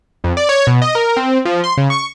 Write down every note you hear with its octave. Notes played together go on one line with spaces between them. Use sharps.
F2
D5
C#5
B2
D#5
A#4
C4
F3
C6
C#3
C#6